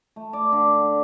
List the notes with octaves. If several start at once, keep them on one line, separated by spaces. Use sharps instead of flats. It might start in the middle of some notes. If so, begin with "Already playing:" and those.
A3
D5
D3